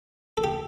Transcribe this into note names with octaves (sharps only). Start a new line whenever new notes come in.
A4
G4